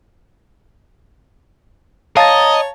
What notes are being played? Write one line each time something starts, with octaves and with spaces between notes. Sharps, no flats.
C#5 D#5 F5 A5 A#5 A6